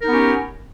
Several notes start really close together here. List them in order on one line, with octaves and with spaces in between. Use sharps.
A#4 D#4 B3 G4 C#4